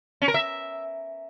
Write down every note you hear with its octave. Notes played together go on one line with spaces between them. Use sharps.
C#4
A#4
E5